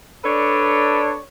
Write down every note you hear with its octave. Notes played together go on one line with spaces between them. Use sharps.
D4 A4 B4 C#5 D5